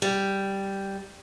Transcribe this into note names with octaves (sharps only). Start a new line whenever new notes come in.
G3